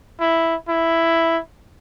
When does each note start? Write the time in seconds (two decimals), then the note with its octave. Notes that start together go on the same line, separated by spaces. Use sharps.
0.20 E4
0.69 E4